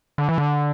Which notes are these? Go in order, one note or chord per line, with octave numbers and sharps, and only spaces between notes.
D3
E3
D3